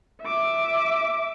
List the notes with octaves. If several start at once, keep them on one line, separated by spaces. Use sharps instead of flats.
E5 D6